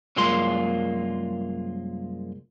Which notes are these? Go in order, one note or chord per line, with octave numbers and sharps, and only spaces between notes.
C2 F#2 G#3 A#3 F4 C6